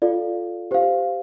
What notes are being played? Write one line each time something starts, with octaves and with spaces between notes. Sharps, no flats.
F4 A4 D5 F5
G4 C5 F5